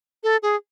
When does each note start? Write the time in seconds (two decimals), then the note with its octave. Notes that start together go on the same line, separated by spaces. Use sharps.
0.23 A4
0.42 G#4